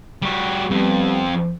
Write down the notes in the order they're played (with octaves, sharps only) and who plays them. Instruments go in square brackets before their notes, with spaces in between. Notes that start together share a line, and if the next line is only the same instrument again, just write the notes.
[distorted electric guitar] G3 F#4
[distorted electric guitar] F2 [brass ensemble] G3 B3